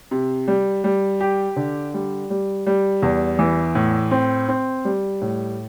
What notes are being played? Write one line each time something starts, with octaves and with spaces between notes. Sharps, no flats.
C3
G3
G3
G4
D3
G3
G3
G3
E2
E3
A2
C4
C4
G3
A2